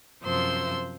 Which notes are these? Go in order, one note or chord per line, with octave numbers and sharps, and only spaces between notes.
F#2 C3 F3 C5 C6 E6